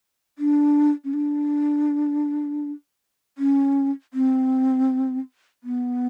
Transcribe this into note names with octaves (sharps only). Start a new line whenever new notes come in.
D4
C#4
D4
C#4
C4
B3